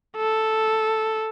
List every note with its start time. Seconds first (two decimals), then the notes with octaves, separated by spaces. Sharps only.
0.17 A4